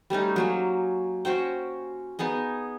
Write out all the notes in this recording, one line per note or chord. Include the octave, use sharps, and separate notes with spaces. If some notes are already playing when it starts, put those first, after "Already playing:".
G3 A3 C#4 D#4
F#3 A#3 C#4
C#4 F#4 C5 G5
B3 D#4 G#4 D#5